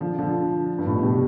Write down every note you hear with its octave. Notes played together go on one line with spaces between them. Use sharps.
D3 F3
D3 F3
G2
A2
B2
A2 C3